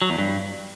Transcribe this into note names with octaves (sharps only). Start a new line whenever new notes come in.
F#3
E2
G2